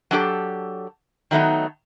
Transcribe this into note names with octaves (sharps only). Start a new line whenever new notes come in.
F#3 D4 G4 A4
D#3 F#3 A3 B3 D#4